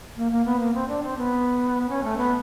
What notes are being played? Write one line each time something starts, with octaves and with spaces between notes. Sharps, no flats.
A#3
A#3
B3
A#3
C4
D4
C4
B3
C#4
A3
B3